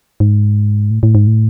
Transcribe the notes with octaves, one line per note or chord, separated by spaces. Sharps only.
G#2
A2
A2
G#2
A2